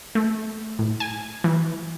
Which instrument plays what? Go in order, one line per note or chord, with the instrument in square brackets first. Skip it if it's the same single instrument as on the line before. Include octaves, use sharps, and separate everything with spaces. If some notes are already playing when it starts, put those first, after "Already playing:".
[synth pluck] A3
A2
G#5
E3